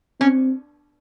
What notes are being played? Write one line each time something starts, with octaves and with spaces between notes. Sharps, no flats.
C4 C#4